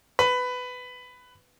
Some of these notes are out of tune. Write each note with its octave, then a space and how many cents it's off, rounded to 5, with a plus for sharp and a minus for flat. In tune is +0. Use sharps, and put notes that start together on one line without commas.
B4 +15